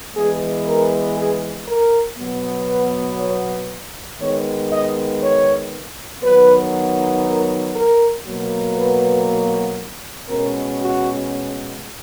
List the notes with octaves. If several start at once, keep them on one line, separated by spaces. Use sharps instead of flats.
E3 G#3 B3 G#4
A#4
G#4
A#4
B2 F#3 B3
B4
C#5
D#3 G#3 B3 C#5
D#5
C#5
D#3 F#3 B3 B4
A#4
A#4
B2 F#3 A#3
B4
B2 G#3 C#4 A#4
F#4